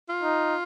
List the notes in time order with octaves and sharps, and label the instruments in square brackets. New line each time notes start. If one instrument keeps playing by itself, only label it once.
[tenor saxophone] F4
[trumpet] D#4